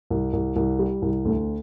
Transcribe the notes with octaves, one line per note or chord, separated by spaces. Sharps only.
C2
C2
C2
G3
C2
D2